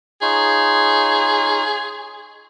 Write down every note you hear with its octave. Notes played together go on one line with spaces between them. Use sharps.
D#4 F4 G#4 C#5